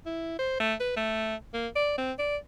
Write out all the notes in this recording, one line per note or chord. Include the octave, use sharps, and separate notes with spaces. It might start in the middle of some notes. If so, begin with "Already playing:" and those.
E4
C5
A3
B4
A3
A#3
D5
C4
D5